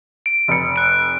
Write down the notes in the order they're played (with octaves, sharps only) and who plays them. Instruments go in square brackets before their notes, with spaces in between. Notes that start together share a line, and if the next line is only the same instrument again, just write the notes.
[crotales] D7
[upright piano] F1 C#7
[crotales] F#6 D7